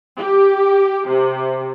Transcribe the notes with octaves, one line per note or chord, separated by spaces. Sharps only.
G4
C3